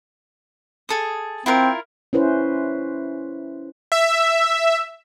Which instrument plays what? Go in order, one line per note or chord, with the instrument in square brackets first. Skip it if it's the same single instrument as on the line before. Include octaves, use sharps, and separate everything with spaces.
[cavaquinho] G#4 A4 D#6
[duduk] C4 [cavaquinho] E4 F4 A#4
[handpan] C#4 E4 B4 C5
[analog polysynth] E5